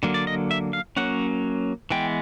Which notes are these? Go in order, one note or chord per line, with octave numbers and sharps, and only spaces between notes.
D3 F#3 A#3
D5
D#5
E5
F5
F#3 A#3 C#4 F#5
E3 G#3 B3 G5